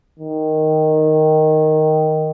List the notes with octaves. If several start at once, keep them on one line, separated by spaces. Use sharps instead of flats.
D#3